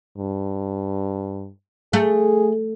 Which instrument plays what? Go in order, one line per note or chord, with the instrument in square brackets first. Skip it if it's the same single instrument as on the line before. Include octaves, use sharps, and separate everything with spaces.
[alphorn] G2
[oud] A3 [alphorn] G#4